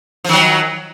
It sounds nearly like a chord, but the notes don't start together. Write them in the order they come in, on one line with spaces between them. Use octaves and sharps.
F3 D#3 F#3